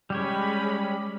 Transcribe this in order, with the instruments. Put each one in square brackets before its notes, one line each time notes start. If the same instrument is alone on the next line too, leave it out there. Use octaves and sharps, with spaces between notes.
[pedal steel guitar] G3 G4 C#5 [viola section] G#3 C#4 B5